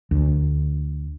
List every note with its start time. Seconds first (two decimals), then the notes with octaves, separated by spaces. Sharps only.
0.11 D2